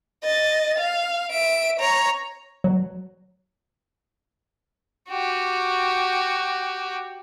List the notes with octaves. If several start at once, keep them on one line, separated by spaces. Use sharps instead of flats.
D#5 A6
F5
E5 D7
C#5 A#5
F#3
F#4 G4